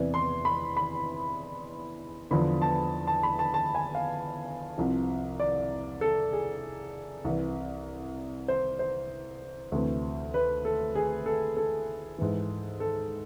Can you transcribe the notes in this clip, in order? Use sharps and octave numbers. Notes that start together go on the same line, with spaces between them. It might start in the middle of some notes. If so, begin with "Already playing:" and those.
Already playing: E2 C3 E3 D5
C6
B5
B5
E2 D3 F3 B5
A5
A5
B5
A5
A5
G#5
F5
C2 C3 F3
D5
A4
G#4
C2 C3 E3
C5
C5
D2 C3 E3
B4
A4
G#4
A4
A4
G#2 E3
A4